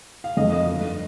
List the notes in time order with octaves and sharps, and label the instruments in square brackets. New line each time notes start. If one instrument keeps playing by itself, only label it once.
[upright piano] F5
F2 D#3 A3 D#5
D#5
G2 D3 A3